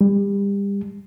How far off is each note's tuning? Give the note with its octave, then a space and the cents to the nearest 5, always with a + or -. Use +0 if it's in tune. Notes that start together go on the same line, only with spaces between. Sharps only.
G3 +30